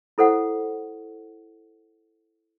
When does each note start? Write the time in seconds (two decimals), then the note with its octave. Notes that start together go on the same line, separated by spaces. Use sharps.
0.18 E4 A4 C5 F#5